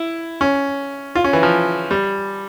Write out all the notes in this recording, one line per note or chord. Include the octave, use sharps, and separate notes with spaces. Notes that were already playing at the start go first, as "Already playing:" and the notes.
Already playing: E4
C#4
F4
C#4
E3
F3
G3